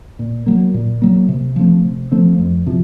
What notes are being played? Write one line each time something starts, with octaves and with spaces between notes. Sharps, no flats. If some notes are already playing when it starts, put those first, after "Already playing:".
A#2
F#3 A#3
A#2
F#3 A#3
C3
F3 A3 C4
C3
F3 A3 C4
F2
C3 F3